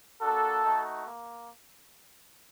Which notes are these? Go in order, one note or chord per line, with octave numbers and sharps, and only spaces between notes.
A#3 D4 F#4 A4
A3 D#4 F#4
A#3